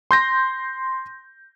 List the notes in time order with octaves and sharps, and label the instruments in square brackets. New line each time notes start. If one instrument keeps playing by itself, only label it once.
[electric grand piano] C6 G6 A#6